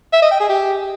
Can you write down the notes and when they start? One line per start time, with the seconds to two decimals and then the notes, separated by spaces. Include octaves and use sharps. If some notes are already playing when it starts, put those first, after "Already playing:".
0.13 E5
0.22 D#5
0.31 G5
0.40 G#4
0.49 G4